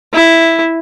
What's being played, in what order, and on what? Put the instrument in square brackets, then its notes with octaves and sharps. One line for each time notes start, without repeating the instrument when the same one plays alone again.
[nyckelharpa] E4